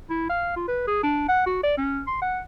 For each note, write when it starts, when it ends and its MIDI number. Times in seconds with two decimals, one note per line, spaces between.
0.10 0.29 64
0.29 0.53 77
0.56 0.64 65
0.68 0.83 71
0.87 1.02 68
1.03 1.25 62
1.28 1.44 78
1.46 1.61 66
1.63 1.75 74
1.77 2.02 61
2.07 2.18 84
2.22 2.41 78